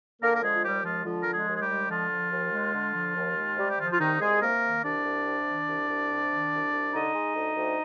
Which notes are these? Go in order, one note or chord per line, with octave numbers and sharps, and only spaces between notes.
D3 A#3 A#4
A#4
F3 G#3 G#4
F4
D#2 G3 G4
F3 G#3 F4
D3 F3 F4
F3 A#4
G#3 G#4
D#2
G#4
G3 G4
G#3
D3 F3 F4
F3
D#2
G#3
D3
F3
D#2
G#3
C3 G3 G4
G4
D#3 F3 F4
F4
C2 D#3 D#4
C2 G#3 G#4
C3 A#3 A#4
D#3
C2 D4 D5
C2
C3
D#3
C2
C2
C3
D#3
C2
C2
D3 D#4 D#5
G#3
D2
D2